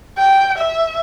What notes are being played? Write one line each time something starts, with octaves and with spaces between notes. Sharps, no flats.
G5
E5